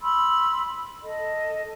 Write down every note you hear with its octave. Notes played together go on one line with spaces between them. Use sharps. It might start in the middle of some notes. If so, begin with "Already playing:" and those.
B5 C6 E6
A4 D#5